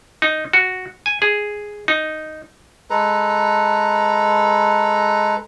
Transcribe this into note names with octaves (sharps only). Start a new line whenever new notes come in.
D#4
F#4
G#5
G#4
D#4
G#3 A4 B4 A#5